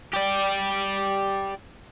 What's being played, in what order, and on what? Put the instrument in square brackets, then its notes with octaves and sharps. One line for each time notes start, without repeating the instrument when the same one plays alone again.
[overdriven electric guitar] G4 D5